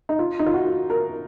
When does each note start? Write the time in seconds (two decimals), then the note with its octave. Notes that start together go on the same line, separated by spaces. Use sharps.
0.09 D#4
0.19 F4
0.39 D#4
0.46 F4
0.54 F#4
0.90 A#4